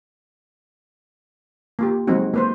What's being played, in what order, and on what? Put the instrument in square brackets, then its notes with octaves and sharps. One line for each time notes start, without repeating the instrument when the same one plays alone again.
[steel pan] A#3 F4 G4
F3 F#3 G#3 C4 D#4 F#4
A#3 B4 C5